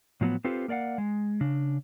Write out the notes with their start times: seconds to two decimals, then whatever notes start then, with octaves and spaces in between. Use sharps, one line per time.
0.21 A2 F3 F#3 A#3 B3
0.44 C4 F4 G4 A4 B4 C5
0.68 A#3 A#4 D5 F5 F#5
0.98 G#3
1.41 C#3 D4